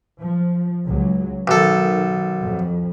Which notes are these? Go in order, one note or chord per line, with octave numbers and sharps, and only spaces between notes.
F3
C#2 F#3
B1 D#3 A4
F2